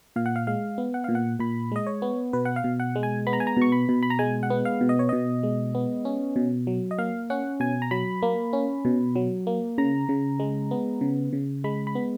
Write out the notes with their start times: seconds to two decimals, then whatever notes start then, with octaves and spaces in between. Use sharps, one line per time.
0.16 A#2 F5
0.26 F#5
0.36 F5
0.47 G#3 F5
0.78 B3
0.94 F#5
1.04 A#2 F5
1.15 F#5
1.39 A#2 B5
1.72 G#3 D#5
1.87 C#5
2.02 B3
2.33 B2 B4
2.45 F#5
2.56 F5
2.64 B2
2.80 F#5
2.96 G#3
3.03 G#5
3.27 B3 B5
3.33 A#5
3.40 G#5
3.47 A#5
3.57 B2 C#6
3.72 B5
3.89 B2
4.03 B5
4.10 A#5
4.19 G#3 G#5
4.43 F#5
4.50 B3
4.65 F5
4.81 B2
4.89 D#5
4.99 C#5
5.09 B2 D#5
5.43 G#3
5.75 B3
6.05 C#4
6.36 B2
6.67 F#3
6.91 D#5
6.98 A#3 F5
7.30 C#4 F#5
7.60 B2 G#5
7.82 A#5
7.91 F#3 B5
8.22 A#3
8.53 C#4
8.85 B2
9.16 F#3
9.47 A#3
9.78 C#3 A#5
10.09 C#3
10.40 G#3
10.71 B3
11.01 C#3
11.33 C#3
11.64 G#3 B5
11.87 B5
11.95 B3